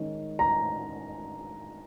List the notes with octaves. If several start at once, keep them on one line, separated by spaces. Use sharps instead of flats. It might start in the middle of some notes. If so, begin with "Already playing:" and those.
Already playing: D#3 G#3 C#4
A#5